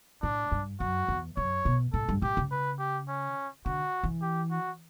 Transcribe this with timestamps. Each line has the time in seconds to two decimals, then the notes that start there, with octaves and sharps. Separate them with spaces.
0.22 A2 D4
0.52 G2
0.80 F#2 F#4
1.08 E2
1.37 F#2 C#5
1.65 B2
1.93 A2 A4
2.09 G2
2.22 A2 G4
2.37 C#3
2.51 B4
2.79 G4
3.08 C#4
3.66 D3 F#4
4.03 E3
4.22 G4
4.51 F#4